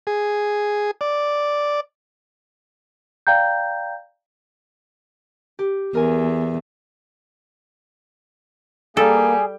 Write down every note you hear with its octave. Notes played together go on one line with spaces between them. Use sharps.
G#4
D5
D5 F5 G5 A#5 G6
G4
E2 A#4 G#5
G3 A#3 G#4 A4